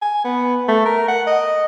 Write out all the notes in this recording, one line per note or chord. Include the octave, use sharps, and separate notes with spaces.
G#5
B3
A3
A#4
F#5
D#5